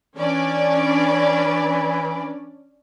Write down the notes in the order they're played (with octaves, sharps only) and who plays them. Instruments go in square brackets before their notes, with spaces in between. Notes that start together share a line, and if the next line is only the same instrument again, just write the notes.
[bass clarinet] E3 [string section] C#4 D4 D5